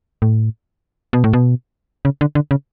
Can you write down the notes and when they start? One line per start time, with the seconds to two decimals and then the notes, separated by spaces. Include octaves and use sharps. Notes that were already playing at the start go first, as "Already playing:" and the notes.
0.22 A2
1.13 B2
1.24 A2
1.33 B2
2.05 C#3
2.21 D3
2.35 D3
2.51 C#3